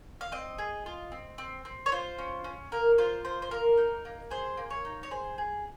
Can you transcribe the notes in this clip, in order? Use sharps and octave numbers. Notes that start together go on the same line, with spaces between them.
F5
C4 D#5
G#4
F4
C4
C4
C4
C#5
F4 C5
C#4
C#4
A#3 A#4
F4 C5
A#3 C5
C5
A#3 A#4
D#4
A#3
G#4 C5
A#3
C#5
D#4
C#5
G#4 C5
G#4